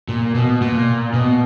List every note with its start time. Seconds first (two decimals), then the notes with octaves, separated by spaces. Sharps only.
0.09 A#2
0.35 B2
0.61 A#2
1.14 B2